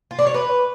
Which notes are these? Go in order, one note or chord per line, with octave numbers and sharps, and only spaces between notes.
F4
D4
C#5
B4